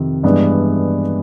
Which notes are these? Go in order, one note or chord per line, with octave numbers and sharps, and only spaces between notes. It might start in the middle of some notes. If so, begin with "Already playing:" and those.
Already playing: F2 C3 D#3
G2 E3 G#3 B3 D4